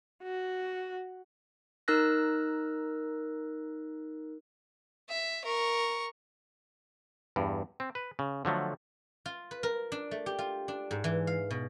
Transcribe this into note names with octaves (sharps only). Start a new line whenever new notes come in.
F#4
D#4 A#4 E6 F#6 A#6
E5
A#4 C#6
E2 G2
C4
B4
C#3
D3 F3 F#3 A3
F4
B4
A#4
D4
A3
G4
F4
D4
G#2
E3
F5
B2